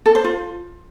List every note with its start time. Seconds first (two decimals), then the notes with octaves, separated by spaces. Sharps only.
0.06 A4
0.15 C5
0.24 F4